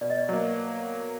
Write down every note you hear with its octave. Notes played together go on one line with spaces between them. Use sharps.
B2 D5
D#5
D5
F#3 A#3 C#5